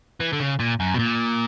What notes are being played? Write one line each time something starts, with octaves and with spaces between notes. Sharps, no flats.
E3
D3
C#3
A#2
F#2
B2
A#2